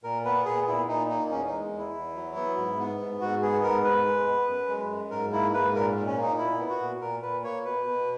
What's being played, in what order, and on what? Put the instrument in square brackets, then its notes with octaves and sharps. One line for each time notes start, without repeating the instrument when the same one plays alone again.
[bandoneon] A#2 A#4
B3 B4
A#2 G#4
A#2 E4
A#2 D#4
A#3 D#4
E2 C#4
D#4
G#3
E2
E4
E2
F#3
B3
G#2
B3
G#2
G#2 F#4
B3 G#4
G#2 A#4
G#2 B4
G#3
B3
F#2
G#3
F#2
G#2 A#4
A#3 E4
G#2 B4
A#2 A#4
A#2
C#4
A#3 D#4
A#2 E4
B3
F#4
A#2
A#2 A#4
A#2 B4
A#3 C#5
B2 B4
B2